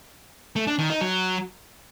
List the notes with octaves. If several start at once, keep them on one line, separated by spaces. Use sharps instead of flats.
A3
D4
D#3
D#4
F#3